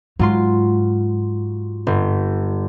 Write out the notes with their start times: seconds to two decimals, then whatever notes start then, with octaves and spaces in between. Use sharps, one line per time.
0.19 G#2 F#3 F4 C6
1.87 G1